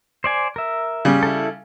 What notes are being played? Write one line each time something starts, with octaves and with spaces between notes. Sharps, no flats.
C5 D5 G#5
A#4 E5
C#3 G3
E4 A4